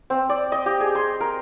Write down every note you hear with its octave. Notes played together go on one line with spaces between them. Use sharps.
C4
D5
D#5
G4
G#4
C6
A#4